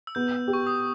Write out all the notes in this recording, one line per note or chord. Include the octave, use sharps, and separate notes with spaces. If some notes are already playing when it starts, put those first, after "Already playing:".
E6
B3 G6
G4
C#6
D#6